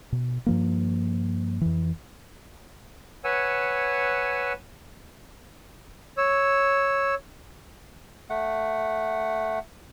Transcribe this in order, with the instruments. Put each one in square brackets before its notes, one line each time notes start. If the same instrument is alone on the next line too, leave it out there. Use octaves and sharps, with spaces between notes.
[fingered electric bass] B2
G2 F3 A#3
F2 E3
[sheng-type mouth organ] B4 C#5 F#5 G#5 E6
C#5 E6
[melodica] A3 F#5